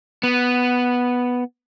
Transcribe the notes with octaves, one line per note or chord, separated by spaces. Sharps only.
B3